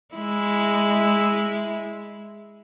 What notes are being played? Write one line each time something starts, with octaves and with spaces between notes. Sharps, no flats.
G#3 E4